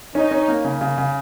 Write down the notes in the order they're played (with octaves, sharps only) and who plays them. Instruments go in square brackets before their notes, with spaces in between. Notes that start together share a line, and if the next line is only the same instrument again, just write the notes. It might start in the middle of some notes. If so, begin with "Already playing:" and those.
[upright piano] C#4 [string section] D#4
[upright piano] C#4
A#3
C#3
C#3
C#3